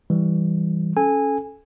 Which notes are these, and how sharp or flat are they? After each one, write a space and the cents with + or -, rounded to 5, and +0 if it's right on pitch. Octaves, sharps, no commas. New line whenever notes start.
E3 +0 G3 +0
C#4 +0 A4 -25 G#5 -15